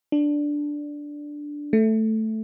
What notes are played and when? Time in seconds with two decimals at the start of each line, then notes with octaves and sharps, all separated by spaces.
0.12 D4
1.73 A3